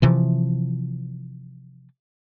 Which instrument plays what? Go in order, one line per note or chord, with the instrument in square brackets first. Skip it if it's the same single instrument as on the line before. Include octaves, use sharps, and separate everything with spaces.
[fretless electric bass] C3 E3 F3